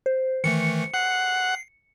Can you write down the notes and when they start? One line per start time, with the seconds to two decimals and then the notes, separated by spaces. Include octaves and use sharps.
0.06 C5
0.44 D#3 E3 A3 C#7
0.94 F#5 C7